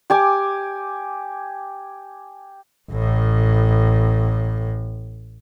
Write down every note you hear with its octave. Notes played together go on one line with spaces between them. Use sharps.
G4 G#5 D6
A1 A2